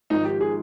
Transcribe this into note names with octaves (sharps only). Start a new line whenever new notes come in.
G#1 G#2 F3 D#4
G4
G#4